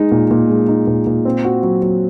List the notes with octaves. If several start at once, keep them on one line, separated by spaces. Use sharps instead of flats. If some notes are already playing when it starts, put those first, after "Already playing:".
Already playing: G#3 D#4
A#2
A#2
G#3
D#4
A#2
A#2
C4
F#4
F#3
F#3